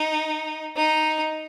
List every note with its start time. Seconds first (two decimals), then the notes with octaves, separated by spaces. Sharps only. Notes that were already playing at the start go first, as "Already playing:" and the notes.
Already playing: D#4
0.76 D#4